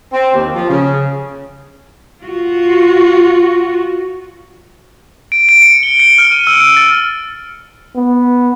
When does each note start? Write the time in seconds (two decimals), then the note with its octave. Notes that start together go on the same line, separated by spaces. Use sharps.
0.13 C4
0.33 D#2
0.54 F3
0.69 C#3
2.24 F4 F#4
5.32 D7
5.49 D7
5.62 C#7
5.83 G7
6.00 C#7
6.18 F6
6.32 D#7
6.47 E6
6.60 C#7
6.77 A6
7.96 B3